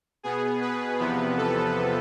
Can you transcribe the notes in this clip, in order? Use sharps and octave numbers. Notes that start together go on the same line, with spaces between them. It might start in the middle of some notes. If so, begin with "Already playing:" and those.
B2 B3 G#4
B4
E2 C3 F3 B3
A4